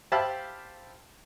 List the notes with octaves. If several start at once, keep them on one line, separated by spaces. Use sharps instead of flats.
G4 C5 E5 F5 A5 B5